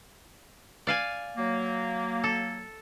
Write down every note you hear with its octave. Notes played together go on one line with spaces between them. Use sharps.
D5 F5 G#5
F#3 A#3
A4